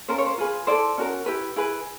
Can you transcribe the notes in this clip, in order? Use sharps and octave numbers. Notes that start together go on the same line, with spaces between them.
C#4 F4 A#4 C5
C#5
C5
F4 G#4 B4
E4 A4 C5 D5
C#4 F#4 A#4
E4 G4 B4
E4 G#4 B4